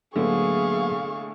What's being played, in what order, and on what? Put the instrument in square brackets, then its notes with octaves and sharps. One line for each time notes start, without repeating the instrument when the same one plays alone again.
[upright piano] A2 D3 [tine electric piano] F#3 A#3 B3 [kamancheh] G#4 [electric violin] F5 C#6